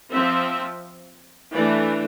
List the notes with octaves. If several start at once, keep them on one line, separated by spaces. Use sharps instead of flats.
F3 C4 E5
E3 A3 D4 D5